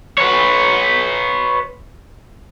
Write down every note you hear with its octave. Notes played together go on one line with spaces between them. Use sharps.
B4 C#5